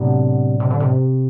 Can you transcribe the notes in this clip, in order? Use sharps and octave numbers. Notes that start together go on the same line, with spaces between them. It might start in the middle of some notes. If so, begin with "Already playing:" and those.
Already playing: A2 C3 F#3 B3 D4
C3
D3
C3